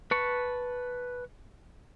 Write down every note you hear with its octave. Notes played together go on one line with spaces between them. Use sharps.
B4 A5 B5 C#6